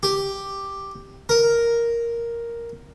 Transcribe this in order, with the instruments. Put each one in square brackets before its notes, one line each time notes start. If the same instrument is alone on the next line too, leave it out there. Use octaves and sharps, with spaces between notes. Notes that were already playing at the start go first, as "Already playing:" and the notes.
[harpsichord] G4
A#4